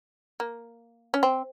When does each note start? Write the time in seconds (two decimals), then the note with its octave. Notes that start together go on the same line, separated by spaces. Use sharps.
0.40 A#3
1.14 C#4
1.23 C4